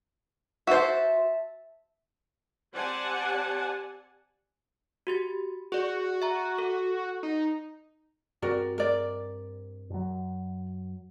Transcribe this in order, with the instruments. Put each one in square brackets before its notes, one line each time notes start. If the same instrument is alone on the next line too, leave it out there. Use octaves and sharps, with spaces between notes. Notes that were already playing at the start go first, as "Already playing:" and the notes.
[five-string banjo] F#4 C5 [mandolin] E5 A5
[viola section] C4 G4 D5 F#5 G#5 A5
[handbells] F#4 G4 A6
[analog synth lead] F#4 [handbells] G#4 D5
[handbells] E5 A#5
A4
[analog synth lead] D#4
[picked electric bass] G2 C4 [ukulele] F#4 A#4 D5
[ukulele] A#4 D5
[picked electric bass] F#2 F#3